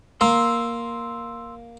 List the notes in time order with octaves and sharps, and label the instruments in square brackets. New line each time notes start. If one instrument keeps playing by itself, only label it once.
[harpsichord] A#3 [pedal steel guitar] C6 E6